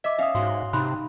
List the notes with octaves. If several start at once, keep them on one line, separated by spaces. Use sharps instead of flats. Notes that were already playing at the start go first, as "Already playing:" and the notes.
D#5 E5 D6
C#4 E5 F5 D#6
G#2 F#4 C6
C3 D#4 B5 C6 F#6